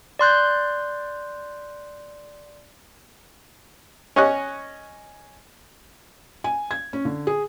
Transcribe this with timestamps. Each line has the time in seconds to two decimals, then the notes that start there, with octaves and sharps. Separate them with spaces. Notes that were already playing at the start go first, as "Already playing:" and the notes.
0.19 D5 C6 F#6 G6
4.16 C#4 C#5 D#5 C#6 F#6
6.44 G#5
6.71 G#6
6.93 C#4
7.05 D3
7.27 G#4